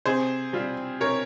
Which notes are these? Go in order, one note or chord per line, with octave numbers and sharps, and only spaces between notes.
C3 G#4 C5
G3 C4 F4
C3 A#4 C#5